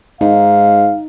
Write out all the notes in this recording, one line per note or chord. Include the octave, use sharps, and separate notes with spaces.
G#2 D#4 F5